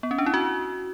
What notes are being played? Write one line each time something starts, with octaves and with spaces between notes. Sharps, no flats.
B3
C#4
D4
E4
F#4